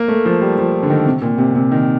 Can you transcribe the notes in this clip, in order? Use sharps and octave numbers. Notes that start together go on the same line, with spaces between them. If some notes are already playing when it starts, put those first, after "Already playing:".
Already playing: A#3
A3
F3
G3
F3
D3
D#3
C3
A#2
C3
C3
D#3